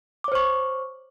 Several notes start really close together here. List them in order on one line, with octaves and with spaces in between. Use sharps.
D6 C#5 C5 C#6